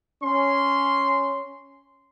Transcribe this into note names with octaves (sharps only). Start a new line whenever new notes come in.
C#4 C6